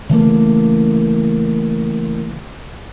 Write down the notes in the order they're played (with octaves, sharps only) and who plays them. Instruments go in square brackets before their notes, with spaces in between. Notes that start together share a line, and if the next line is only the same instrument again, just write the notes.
[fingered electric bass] C#3 E3 A3 A#3